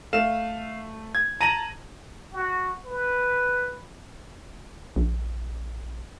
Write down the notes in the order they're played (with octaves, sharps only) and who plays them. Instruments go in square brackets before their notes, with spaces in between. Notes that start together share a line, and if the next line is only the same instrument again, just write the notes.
[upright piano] A3 [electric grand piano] F5 E7
[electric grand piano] G#6
[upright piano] A5 A#6 F#7 [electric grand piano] A#5 D#7
[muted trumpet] F#4
B4
[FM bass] A#1